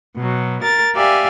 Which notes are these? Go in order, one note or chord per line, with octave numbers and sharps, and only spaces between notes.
B2 F#3
A#4 A6
G4 D5 E5 F5 G#5